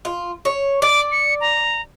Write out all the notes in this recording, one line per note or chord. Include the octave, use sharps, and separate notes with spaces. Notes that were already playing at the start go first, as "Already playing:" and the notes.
F4
C#5
D5 D6
C#7
A#5